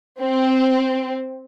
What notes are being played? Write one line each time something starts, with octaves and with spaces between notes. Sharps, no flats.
C4